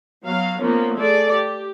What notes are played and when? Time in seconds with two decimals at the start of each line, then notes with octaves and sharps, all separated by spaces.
0.25 F#3 B3 F5
0.59 F3 A#3 B3 C#4
0.96 A3 G#4 A4 D5
1.32 G4